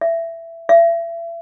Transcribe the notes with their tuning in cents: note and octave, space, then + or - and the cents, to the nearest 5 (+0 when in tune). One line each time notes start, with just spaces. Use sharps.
E5 +15
E5 +35